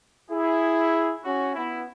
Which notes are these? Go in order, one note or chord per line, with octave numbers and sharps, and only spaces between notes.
E4 G#4
C#4 F#4
B3 E4